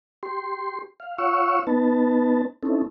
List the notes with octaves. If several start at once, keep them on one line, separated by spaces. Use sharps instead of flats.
G4 C6
F5
F4 C#5 F5 F#5 C#6 E6
B3 D#4 B4 A5
C4 C#4 D#4 E4 A4